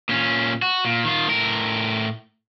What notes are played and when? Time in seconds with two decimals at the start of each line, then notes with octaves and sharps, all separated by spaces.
0.09 A#2 C#4
0.62 F#4
0.85 A#2
1.04 D#3 F4
1.28 A2 A#4